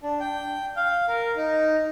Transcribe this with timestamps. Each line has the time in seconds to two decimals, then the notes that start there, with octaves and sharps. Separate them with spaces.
0.03 D4
0.20 G5
0.76 F5
1.08 A#4
1.36 D#4